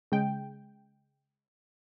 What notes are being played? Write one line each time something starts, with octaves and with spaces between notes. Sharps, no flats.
C#3 G#3 G5